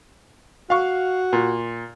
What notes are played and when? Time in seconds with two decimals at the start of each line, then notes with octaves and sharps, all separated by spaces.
0.70 F#4 F5 C#6
1.33 A#2